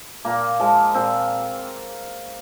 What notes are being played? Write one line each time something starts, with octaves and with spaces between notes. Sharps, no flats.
A#2 A#3
F3 G#3
A#2 C4